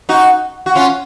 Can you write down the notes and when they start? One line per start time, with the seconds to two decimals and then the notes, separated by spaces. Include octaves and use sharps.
0.09 D#4 F#4
0.66 F#4
0.75 C#4 F4